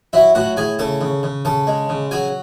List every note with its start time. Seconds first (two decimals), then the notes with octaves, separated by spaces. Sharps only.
0.13 F#3 E4 E5
0.35 A2 F#4 F#5
0.57 A2 G#4 G#5
0.79 C#3 A4 A5
1.01 C#3
1.23 C#3
1.45 C#3 A4 A5
1.67 G#3
1.89 C#3
2.11 F#3 G#4 G#5